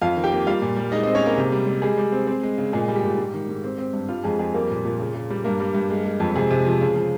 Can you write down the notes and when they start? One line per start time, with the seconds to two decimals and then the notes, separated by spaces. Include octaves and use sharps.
0.02 F2 F4 F5
0.16 D#3
0.24 G4 G5
0.32 A#3
0.47 G3 F4 F5
0.62 A#2
0.77 G3
0.92 G#3 D#4 D#5
1.03 D#4 D#5
1.06 C4
1.15 C#4 C#5
1.22 G#3 A#3 A#4
1.37 C3
1.52 G3
1.67 G3
1.82 G3 G#3 G#4
1.98 G3
2.12 C4
2.27 C4
2.43 G#3
2.58 C#3
2.73 A#2 G#3 G#4
2.88 G3
2.96 G4
3.04 A#2
3.18 G#2
3.34 D#3
3.49 G#2
3.64 C4
3.78 C4
3.93 G2
4.08 G3 F4
4.24 F2 G#3 G#4
4.39 F2 G#3 G#4
4.54 G3 A#3 A#4
4.70 A#2
4.85 A#2
5.00 C#3
5.14 C#3
5.30 G3
5.44 G2 A#3 A#4
5.60 G3
5.75 G2
5.90 G#3
6.05 G#3
6.20 F2
6.36 C3 G#3 G#4
6.51 C3
6.66 F3
6.81 C#3
6.96 F3